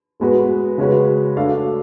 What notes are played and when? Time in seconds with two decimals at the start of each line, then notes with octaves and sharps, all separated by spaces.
0.20 A2 G#3 B3 F#4 B4
0.78 C#3 G#3 C#4 F#4 B4
1.36 A3 D4 F#4 A4 F5